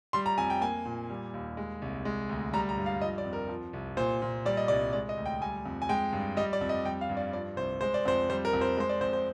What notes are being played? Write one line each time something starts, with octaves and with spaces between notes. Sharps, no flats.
G3 C6
A#5
F2 G#5
G5
A#3 G#5
A#2
G3
D#2
G#3
C2
G#3
D2
G3 A#5
A#5
G2
F5
F3 D#5
D5
F2
A#4
F3
C2
A#2 C5
A#2
G3 D5
D#5
C2 D5
G#3 D5
D#5
D2
G5
G3 G#5
F2
G#5
G#3 G5
G2
G3 D#5
D5
F2
D#5
G3 G5
F5
G2
D5
F3 D5
C2 C5
G#3 C5
D5
F2 C5
G3 C5
A#4
F2
C5
G#3 C5
D5
F2 C5
C5